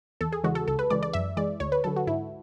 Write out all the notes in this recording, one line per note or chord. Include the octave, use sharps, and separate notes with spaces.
E2 A4
G#4
C#3 E3 G#3 F#4
A4
C#2 A4
B4
C#3 E3 G#3 D5
D5
F#2 E5
E3 G#3 D5
D2 C#5
B4
D3 F#3 A4
F#4
G#2 E4